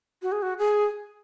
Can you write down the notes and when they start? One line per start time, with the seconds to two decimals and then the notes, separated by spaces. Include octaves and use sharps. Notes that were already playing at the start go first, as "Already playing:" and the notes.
0.22 F#4
0.32 G#4
0.42 F#4
0.58 G#4